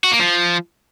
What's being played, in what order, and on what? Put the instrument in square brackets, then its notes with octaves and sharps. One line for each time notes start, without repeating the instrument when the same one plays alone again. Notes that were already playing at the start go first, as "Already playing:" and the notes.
[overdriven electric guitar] F#4
A#3
F3